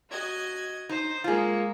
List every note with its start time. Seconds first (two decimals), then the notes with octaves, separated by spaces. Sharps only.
0.10 F#4 D#5 G#6
0.89 D#4 C5
1.24 G#3 A#3 F4 G#4